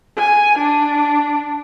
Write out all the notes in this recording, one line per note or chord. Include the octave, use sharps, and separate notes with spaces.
G#5
D4